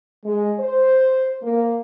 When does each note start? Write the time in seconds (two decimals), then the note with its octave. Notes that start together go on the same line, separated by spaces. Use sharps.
0.25 G#3
0.59 C5
1.43 A#3